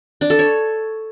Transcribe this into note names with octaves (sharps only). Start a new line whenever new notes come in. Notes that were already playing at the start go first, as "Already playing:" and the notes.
D4
A4
C#5